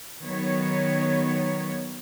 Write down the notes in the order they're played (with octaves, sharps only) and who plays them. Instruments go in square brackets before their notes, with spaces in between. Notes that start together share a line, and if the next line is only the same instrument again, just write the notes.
[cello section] D#3 F#3 B3 C#5